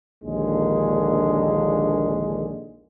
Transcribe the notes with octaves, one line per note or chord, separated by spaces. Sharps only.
A#1 D#2 D3 G#3